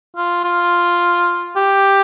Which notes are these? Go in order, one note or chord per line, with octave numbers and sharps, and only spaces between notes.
F4
F4
G4